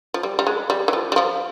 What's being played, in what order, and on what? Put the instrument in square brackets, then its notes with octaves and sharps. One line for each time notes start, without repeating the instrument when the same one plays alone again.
[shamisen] F3
G3
G3
G#3
G3
E3
F3
G3
F3